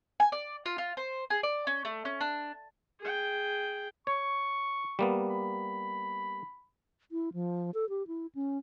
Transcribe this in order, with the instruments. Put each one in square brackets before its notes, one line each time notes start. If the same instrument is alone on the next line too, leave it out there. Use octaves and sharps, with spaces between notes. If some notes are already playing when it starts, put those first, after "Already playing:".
[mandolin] G#5
D5
F4
F4
C5
G#4
D5
C#4
A3
C#4
D4
[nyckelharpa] G#4 G5
[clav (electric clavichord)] C#5 [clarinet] C#6
[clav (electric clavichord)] G3 A#3 B3
[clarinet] B5
[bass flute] E4
F3
A4
G4
E4
C#4